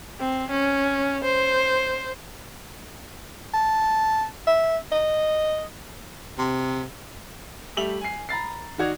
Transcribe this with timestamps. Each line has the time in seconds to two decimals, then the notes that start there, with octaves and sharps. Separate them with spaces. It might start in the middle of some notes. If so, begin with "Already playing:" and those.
0.20 C4
0.50 C#4
1.24 C5
3.54 A5
4.47 E5
4.92 D#5
6.38 C3
7.77 G3 A3 G4 E5 F7 F#7
8.01 G#5 C7
8.29 A#5 B5 A6 C7
8.78 D#3 D#4 F#4 D5 G#6 F7